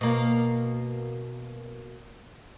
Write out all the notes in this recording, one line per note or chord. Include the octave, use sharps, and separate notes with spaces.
B2 A#3